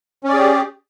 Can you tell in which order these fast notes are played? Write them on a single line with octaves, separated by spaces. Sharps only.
C#4 D5 G#4 G4